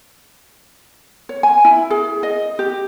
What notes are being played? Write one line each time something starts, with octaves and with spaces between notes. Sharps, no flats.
C#5
G#5
E4
G#4
D#5
G4